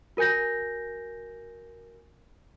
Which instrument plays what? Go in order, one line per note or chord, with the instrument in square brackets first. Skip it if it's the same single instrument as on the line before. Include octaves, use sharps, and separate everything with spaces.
[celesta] F#4 A#4 G#5 G6 A#6